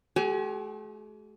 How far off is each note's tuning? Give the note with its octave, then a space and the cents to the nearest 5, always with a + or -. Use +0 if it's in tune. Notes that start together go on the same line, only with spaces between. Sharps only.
A3 -45 G4 -30 G#5 +25